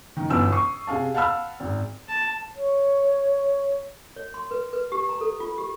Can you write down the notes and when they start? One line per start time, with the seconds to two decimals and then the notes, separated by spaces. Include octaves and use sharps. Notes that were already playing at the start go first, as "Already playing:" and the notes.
0.17 D#3
0.30 G1 B2 E3 G#5 E6
0.52 C#6 D#6 C7
0.87 C3 G#4 F5 A5
1.14 F5 F#5 A5 B5 E6 F6
1.60 G#1
2.09 A5
2.56 C#5
4.16 C#5
4.34 C6
4.51 B4
4.73 B4
4.92 G4
5.09 A#5
5.21 A4
5.40 F4
5.58 G4